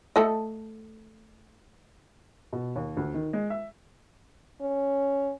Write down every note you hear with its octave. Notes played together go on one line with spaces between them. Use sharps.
A3 A4 D#5
B2
D#2
D2
D#3
G#3
E5
C#4